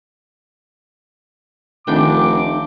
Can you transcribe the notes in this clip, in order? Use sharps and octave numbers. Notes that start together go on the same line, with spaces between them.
F1 D#3 D4 G5 D6